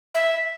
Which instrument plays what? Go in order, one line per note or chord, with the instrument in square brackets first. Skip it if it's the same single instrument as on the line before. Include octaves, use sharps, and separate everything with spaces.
[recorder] E5